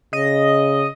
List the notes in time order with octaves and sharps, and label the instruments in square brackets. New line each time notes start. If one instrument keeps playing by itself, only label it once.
[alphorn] C#3 [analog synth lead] D#5